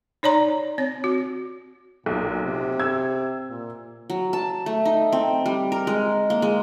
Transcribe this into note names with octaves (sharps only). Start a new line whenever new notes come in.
D#4 C#5 D5 A#5 C6
C4 C#5
F#4
B1 A#2
C3
E6 G#6
A#2
F#3
A5
A3
D#4
C4
G3
A#4
G#3
A#3
G#3